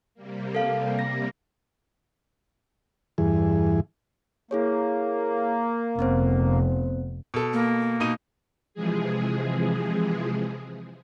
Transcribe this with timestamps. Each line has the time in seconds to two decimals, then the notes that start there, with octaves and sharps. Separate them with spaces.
0.14 C3 G3 A#3
0.55 A4 F5
0.99 A#6
3.18 E2 G2 E3 G#4
4.51 A#3 E4 G#4 C#5
5.99 F1 B3 C4 C5
7.34 B2 A4
7.53 A#3
8.00 B2 D#4 D#7
8.74 C3 E3 F3 G#3 G#4